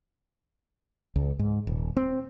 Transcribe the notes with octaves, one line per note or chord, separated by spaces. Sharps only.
C#2
G#2
D#1
C4